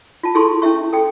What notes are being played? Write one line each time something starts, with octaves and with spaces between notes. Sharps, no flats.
F4 A5
E4 G#4 A4 C6 C#6
C#4 E4 E5 C#6
A4 G5